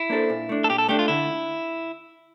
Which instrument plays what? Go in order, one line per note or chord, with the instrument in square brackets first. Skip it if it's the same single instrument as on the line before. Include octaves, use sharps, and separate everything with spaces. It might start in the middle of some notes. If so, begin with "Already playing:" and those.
Already playing: [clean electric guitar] E4
[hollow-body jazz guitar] A#3 D4 A4 C5
A#2
A3 D4
[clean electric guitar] A4
[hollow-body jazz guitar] A#2 [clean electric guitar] G4
[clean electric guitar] A4
[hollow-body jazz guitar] A3 D4 [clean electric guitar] G4
[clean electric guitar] F4
[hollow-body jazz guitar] D3 [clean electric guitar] E4